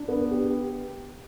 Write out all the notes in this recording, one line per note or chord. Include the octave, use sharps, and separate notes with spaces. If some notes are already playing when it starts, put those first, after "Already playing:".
Already playing: D4
B3
G4